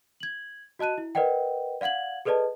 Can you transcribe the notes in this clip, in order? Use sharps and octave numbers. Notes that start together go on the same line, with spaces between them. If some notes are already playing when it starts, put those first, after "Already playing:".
G#6 F#7
F#4 D#5 A5 F#6 D#7
E4
A#4 B4 D5 D#5 F#5 G5
D5 F5 F#5 G#6 F#7
G#4 A4 B4 D5 D#5 A5